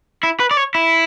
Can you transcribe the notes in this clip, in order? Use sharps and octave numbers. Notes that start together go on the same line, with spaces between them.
E4
B4
D5
C#5
E4